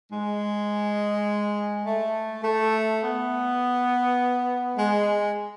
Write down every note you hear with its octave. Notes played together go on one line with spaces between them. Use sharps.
G#3
A3
A3
B3
G#3